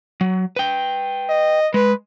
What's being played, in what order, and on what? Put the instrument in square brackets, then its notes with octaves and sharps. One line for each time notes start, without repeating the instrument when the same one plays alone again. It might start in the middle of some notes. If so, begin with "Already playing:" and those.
[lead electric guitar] F#3
B4 G5
[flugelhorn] D#5
[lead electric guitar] G#3 [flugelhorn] B4